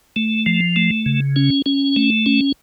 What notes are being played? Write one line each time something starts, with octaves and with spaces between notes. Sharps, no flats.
A3
F3
A3
C#3
C#4
C#4
A3
C#4